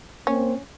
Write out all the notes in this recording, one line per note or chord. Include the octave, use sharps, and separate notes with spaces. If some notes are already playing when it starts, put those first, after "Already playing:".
A#3 C4 C#4